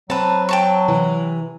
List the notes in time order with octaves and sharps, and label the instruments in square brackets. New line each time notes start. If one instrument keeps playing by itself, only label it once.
[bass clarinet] F#3 [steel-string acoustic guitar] C4 [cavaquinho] B4 A5
[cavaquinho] G5 A5 C#6
[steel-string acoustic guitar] C3 E3